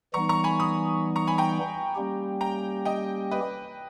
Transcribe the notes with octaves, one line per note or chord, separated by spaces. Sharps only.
E3 G3 B3 D#4 A#5 C#6
A#5 C#6
G#5 B5
B5 D#6
A#5 C#6
G#5 B5
G5 A#5
G3 A#3 C#4 G4
G5 A#5
D#5 G5
B4 D#5